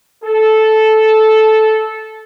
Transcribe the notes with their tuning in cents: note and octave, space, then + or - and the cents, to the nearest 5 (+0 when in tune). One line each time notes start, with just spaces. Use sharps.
A4 -10